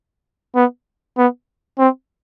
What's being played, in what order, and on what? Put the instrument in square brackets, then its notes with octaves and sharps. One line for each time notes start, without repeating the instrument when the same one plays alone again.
[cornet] B3
B3
C4